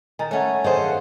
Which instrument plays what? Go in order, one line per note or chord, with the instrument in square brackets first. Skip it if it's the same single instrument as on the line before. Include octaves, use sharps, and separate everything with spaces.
[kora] D#3 [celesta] G#5 A#5 A6
[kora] A3 C#4 [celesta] C#5 F#5 [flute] G#5
[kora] D#3 [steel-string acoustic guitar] G#4 A4 C5
[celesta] F5 [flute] F#5